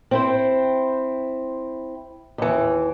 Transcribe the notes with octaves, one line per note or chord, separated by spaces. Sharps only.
C4 E4 C5
D#2 E3